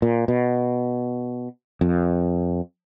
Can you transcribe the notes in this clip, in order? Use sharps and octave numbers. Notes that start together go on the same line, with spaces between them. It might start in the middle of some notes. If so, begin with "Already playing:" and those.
A#2
B2
F2